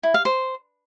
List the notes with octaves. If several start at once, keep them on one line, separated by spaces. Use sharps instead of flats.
E4
F5
C5